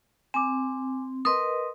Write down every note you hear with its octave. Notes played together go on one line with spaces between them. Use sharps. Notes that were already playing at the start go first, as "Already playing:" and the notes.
C4 G#5 D6
A#4 B4 D#5 C6 D#6